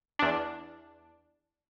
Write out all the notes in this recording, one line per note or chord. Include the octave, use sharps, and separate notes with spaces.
E2 D4